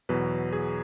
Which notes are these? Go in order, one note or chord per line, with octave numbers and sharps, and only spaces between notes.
E2 B2 F#3 B4
G#4